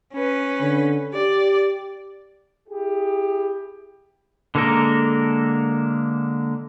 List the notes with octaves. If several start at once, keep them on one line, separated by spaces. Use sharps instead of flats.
C#4 B4
D3
G4 D5
E4 G4 G#4
D3 G#3 A#3 A4 A#4